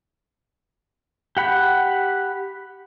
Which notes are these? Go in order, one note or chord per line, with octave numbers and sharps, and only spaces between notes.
G4 F#5 B5